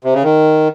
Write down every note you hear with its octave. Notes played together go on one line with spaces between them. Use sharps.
C3
C#3
D#3